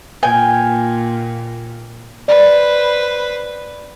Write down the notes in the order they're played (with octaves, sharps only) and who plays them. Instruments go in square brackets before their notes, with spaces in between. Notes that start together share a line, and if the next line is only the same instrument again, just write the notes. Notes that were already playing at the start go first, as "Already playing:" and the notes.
[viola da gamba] A#2 [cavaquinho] G5 G#5
[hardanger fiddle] B4 C5 [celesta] D5